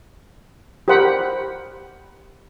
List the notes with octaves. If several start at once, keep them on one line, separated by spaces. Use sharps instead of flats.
G4 A#4 C5 F#5 B5